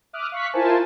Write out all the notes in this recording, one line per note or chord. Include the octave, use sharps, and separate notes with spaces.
E5 D6 D#6 F6 F#6
F5 C#6 F#6 B6
E4 F4 A#4 C5 G#5 A5